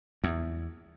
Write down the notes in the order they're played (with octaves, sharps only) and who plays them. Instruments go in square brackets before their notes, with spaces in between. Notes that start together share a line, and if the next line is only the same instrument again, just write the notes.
[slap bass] E2